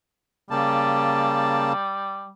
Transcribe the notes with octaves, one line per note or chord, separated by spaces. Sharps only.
C#3 G3 A#3 A5